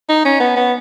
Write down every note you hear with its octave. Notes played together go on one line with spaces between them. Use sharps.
D#4
C#4
B3
B3